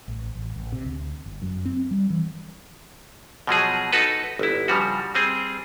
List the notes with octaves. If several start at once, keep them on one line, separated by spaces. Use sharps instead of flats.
A1
A1
A1
C3
D2
G1
F#2
C4
G3
E3
B2 F3 F#3 G#4
D#4 F#4 A4 B4
G1 E4
C#3 F3 G3 F#4
G3 C4 G#4